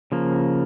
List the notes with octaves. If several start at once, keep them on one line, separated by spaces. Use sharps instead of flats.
C#3 F3 A#3